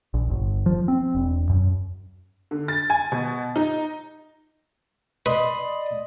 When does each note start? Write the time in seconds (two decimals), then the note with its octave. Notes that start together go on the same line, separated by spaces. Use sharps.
0.14 A#1
0.30 G1
0.66 F3
0.88 C4
1.15 E1
1.49 F#2
2.51 D3
2.68 A6
2.90 G#5
3.12 B2
3.56 D#4
5.26 B4 D5 D#5 B5 C6